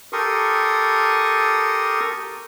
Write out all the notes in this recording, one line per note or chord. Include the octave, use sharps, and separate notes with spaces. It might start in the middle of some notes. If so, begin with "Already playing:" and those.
G4 A4 A#4 C6 C#6 D#6